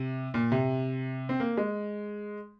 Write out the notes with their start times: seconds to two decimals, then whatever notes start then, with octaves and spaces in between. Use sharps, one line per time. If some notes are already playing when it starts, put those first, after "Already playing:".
Already playing: C3
0.34 A#2
0.52 C3
1.29 C4
1.40 A#3
1.57 G#3